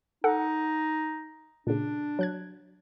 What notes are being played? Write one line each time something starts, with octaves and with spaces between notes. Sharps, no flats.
D#4 A4 F#5
A#2 C#3 D4
F#3 F#6 G#6